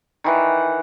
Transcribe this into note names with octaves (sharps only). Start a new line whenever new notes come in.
D#3 E3 F#5